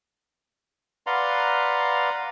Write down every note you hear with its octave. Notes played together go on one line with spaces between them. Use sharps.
B4 D5 F5 F#5 A#5 C6